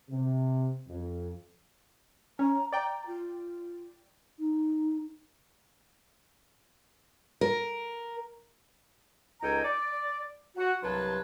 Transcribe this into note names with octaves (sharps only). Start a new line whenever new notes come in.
C3
F2
C#4 A#5
D5 G5 A#5
F4
D#4
A#4
C#2 D#4 A4 G5 G#5 A#5
D5
F#4
C2 G2 F#3 B4 A5 C6